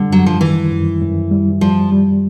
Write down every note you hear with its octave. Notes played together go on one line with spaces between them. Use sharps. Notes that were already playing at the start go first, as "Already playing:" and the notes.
Already playing: D3 G3
F#2 F#3
F3
D#3 E3
F#2
F#2
G3
F3 G3
G3